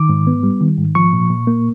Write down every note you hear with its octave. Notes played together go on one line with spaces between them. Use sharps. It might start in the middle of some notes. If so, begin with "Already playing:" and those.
Already playing: D#3 D6
G#2
B3
G3
D#3
G#2
F3 C#6
A#2
A#2
A#3